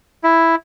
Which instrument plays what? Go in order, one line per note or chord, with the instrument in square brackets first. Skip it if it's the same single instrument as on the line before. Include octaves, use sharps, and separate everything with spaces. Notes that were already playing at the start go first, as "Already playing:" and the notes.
[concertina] E4